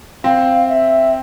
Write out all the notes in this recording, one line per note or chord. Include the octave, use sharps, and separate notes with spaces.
C4 F5
E5